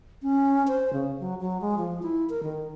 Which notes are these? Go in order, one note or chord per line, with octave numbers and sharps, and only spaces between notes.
C#4
C5
C#3
F#3
F#3
G#3
F3
E4
A#4
D#3